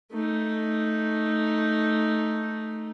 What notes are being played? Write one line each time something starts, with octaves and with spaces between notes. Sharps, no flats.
A3 D#4